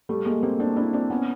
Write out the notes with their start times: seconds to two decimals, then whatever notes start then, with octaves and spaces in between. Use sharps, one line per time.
0.09 G3 A3
0.26 G#3 A#3
0.43 A#3 C4
0.60 C4 D4
0.77 D4 E4
0.93 C4 D4
1.10 B3 C#4